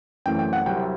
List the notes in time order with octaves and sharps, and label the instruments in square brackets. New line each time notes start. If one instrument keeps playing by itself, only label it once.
[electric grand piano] F#2 E3 A3 C4 G5
G5
F#5
C2 C3 F#3 G5